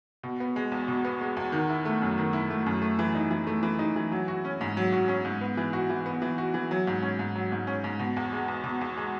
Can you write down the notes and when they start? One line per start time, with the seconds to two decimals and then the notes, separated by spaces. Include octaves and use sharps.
0.23 B2
0.40 B3
0.56 G#3
0.72 E2
0.88 B2
1.05 B3
1.21 G#3
1.37 E2
1.52 D#3
1.69 E4
1.85 A3
2.02 F#2
2.18 D#3
2.33 E4
2.50 A3
2.66 F#2
2.82 A3
2.99 E3
3.15 D#4
3.31 E3
3.47 A3
3.63 E3
3.79 D#4
3.96 E3
4.12 F#3
4.28 F#4
4.45 C#4
4.61 G#2
4.77 F#3
4.92 F#4
5.08 C#4
5.25 G#2
5.41 B3
5.57 E3
5.73 F#4
5.90 E3
6.06 B3
6.22 E3
6.38 F#4
6.54 E3
6.71 F#3
6.87 G#2
7.02 C#4
7.19 G#2
7.35 F#3
7.52 G#2
7.67 C#4
7.84 G#2
7.99 B2
8.17 E2
8.33 G#3
8.48 E2
8.64 B2
8.81 E2
8.97 G#3